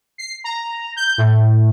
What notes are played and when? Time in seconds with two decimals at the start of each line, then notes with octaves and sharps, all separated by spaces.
0.18 C7
0.44 A#5
0.96 G6
1.18 A2